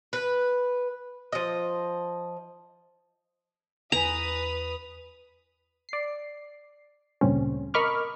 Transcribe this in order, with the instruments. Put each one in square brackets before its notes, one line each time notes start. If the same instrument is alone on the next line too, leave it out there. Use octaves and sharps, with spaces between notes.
[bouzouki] B4
F3 D#5
[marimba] E2 G#5 [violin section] B4 D#6 [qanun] A#5 [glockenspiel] F7
[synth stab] D5 C7
D2 G2 A#2 C#3 C4 C#4
A#4 D#5 B5 C#6 D6 F6